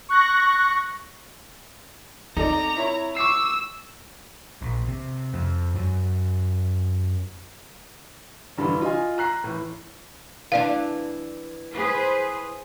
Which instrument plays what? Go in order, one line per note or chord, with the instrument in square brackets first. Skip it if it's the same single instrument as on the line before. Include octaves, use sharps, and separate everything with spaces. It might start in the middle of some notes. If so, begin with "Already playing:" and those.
[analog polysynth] C#6 F#6 A#6
[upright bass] C4 [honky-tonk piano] D#4 A4 D5 [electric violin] A#5
[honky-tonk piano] E4 C#5
[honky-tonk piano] C#6 D6 C7 [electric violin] E6
[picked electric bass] A#1
C3
F2
F#2
[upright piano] F1 G2 D3 E3
F4 D#5 G#5
A#5 F#6 C7
A2 E3
[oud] E3 D4 [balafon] D5 F5
[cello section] G#4 B4 C5